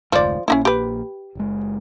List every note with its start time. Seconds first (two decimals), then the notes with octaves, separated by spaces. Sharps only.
0.12 F1 D2 G#2 F3 D5
0.48 A#1 A#3 C#4 D#4 E4
0.65 G4 B4
1.35 F#1 G#3